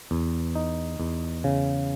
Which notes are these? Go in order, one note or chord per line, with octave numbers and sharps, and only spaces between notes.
E2
D#4
E2
C#3